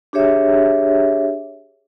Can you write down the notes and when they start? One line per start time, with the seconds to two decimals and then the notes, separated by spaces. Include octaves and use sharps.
0.13 D4 G4 G#4 C#5 E5